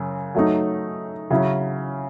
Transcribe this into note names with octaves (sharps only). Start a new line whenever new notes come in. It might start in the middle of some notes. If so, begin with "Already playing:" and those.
Already playing: F#2 C#3
F#3 A3 D#4
C#3 F#3 C#4 E4